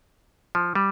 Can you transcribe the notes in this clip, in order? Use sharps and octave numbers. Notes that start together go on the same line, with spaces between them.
F3
G3